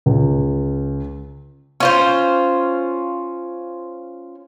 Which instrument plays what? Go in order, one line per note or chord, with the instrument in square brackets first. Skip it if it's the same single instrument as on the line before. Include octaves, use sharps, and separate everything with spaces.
[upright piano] C#2
[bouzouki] C#4 F4 C5